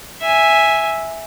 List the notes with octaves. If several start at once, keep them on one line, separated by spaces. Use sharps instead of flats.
E5 G#5